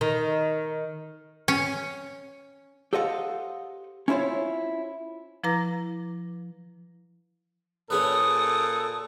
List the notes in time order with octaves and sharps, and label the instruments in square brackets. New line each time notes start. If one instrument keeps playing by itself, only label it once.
[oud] D#3
[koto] C#4
[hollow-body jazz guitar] G4 A4 C5 D#5 F5 F#5
C#4 E4 F4 C5 C#5
[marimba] F3 E4 B4 A#5 D6 A#6
[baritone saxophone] A#2 [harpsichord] C#4 G#4 B4 [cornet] A4 [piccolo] D#6